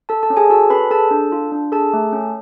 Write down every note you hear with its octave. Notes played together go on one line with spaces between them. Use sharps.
A4 A5
A4 A5
C#4
G#4 G#5
F#4 A4 A5
C#4 B4 B5
G#4 A4 A5
D4
F4
D4
G#4 A4 A5
A3
C#4